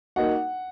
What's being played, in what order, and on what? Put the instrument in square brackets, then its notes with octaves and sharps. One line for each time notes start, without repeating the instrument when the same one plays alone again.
[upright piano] A#3 D#4 F#4 [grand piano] F#5